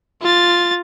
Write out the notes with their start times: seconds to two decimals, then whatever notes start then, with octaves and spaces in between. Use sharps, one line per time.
0.22 F4 A6